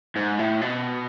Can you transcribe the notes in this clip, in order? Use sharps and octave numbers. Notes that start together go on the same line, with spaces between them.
G#2
A2
B2